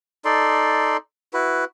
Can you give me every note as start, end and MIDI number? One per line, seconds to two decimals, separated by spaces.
0.25 0.97 63
0.25 0.97 69
0.25 0.97 74
0.25 0.97 84
1.33 1.65 64
1.33 1.65 66
1.33 1.65 71